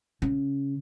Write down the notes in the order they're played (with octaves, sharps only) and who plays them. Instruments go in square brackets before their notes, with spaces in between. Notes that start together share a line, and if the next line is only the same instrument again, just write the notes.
[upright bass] C#3